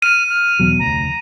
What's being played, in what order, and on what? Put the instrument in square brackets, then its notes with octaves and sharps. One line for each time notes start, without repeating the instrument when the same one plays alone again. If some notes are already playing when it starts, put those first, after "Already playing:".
[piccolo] F6 [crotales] D#7
[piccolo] F6
[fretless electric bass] E2 B2 F#3
[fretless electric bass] F1 D2 [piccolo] A#5